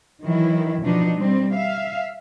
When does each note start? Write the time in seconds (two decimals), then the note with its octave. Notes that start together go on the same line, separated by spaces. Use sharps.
0.22 D#3 E3 F#3 E4
0.83 B2 F3 D4 D#4
1.16 G3 C4
1.52 E5 F5